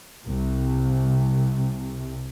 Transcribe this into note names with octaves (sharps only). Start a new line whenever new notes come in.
C2 C3